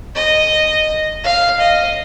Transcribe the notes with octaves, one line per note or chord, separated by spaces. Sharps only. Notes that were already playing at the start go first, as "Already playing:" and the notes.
D#5
F5
D#5